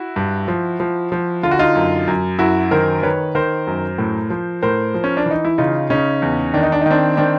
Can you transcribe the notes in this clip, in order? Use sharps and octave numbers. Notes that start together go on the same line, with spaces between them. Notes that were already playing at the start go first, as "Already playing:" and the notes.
Already playing: E4 F#4
G2
F3
F3
F3
D3 F4
F#4
D#4 F4
F#2
F#2
F#2 E4 F#4
D#3 A#4 C5
D#3 B4 C#5
D#3 A#4 C5
F#2
A2
F3
A2 A#4 C5
F3
C#4
D4
E3 D#4
E4
C#3 D#4 F4
C#3 C#4 D#4
E2
D#3 D4
D#4
D4
D#4
D#3 C4 D4
D#3 C4 D4